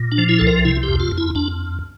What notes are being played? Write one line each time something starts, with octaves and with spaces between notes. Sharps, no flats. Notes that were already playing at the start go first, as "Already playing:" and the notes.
Already playing: A#2
D4
F3
E4
C2 A4
A#4
C3 E4
G4
F2
F4
F2
E4
F2 D4